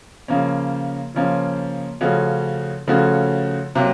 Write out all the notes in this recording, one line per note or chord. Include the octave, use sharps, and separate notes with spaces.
C#3 F3 A#3 C#4
C#3 F3 A#3 C#4
C#3 F3 A3 C#4 F#4
C#3 F3 A3 C#4 F#4
C3 F#3 A#3